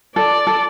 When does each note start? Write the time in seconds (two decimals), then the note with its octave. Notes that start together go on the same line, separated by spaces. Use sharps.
0.16 A4 D5
0.47 A4